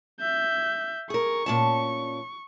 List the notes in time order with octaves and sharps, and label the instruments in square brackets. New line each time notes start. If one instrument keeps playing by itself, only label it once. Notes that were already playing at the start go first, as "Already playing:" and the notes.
[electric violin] E5 G6
[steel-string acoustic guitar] G#4 A#4 [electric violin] C#6
[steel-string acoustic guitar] A#2 C#4 A5